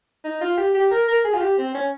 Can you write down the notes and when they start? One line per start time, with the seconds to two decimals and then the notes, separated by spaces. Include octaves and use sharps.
0.25 D#4
0.41 F4
0.58 G4
0.74 G4
0.91 A#4
1.08 A#4
1.25 G#4
1.34 F4
1.41 G4
1.58 C4
1.75 C#4